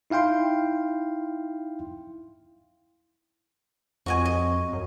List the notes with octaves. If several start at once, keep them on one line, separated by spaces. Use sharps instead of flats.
D#4 E4 F5 G5 C6
F2 F#4 D#5 G#5
D#5
F#2